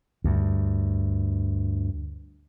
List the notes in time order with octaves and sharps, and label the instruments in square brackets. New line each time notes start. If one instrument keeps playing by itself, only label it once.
[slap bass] D2 G2